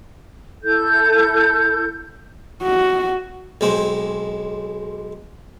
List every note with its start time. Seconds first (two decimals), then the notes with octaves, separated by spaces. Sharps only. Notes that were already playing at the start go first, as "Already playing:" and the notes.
0.63 E4 A4 G6
2.63 F#4
3.61 B1 G#3 C4